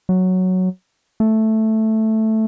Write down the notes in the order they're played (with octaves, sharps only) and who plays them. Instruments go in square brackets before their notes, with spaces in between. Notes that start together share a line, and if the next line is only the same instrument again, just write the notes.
[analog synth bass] F#3
A3